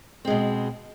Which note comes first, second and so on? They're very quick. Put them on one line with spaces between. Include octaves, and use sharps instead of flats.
C4 G#3 B2